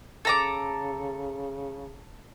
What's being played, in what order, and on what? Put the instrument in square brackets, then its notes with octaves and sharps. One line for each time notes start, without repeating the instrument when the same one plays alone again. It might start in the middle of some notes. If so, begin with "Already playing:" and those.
[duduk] C#3 [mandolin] A4 A#5 D6